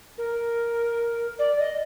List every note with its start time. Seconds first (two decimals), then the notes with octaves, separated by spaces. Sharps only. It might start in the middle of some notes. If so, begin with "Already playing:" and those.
0.18 A#4
1.38 D5
1.59 D#5